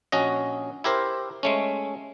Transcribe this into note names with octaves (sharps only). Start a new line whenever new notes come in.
A#1 C#4 F#4 D#5
E4 G4 A#4 C5
G#3 A3 C#4